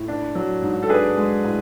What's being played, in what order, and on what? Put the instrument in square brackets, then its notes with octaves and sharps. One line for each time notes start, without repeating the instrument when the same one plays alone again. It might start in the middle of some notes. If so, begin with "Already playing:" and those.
Already playing: [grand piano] A2
D4
F#3
G#2
A4
D4 G#4 B4
G#3
A2